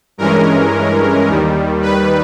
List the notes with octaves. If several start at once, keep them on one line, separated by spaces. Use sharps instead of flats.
G2 E3 G#3 C#4 A#4
D#2 D#3 G3
B4